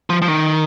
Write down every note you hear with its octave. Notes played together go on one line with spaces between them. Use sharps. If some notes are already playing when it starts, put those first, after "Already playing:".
F3
F3
D#3